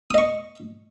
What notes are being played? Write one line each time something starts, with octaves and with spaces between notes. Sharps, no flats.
D#5 C#6 D#6